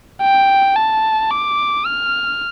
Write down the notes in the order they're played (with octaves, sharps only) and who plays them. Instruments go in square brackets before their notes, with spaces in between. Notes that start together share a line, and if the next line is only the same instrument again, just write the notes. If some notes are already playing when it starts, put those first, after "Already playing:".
[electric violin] G5
A5
D6
F6